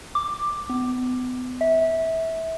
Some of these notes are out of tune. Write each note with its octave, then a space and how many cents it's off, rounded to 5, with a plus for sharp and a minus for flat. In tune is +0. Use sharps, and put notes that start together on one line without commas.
D6 +10
B3 +35
E5 -20